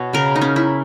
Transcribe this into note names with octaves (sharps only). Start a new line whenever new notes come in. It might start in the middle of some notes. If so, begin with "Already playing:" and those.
Already playing: B2 B3 C#5
C#3 A#4
D#4
C#4
E4